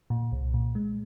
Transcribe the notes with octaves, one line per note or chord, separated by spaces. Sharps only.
A#2
C2
A#2
G#3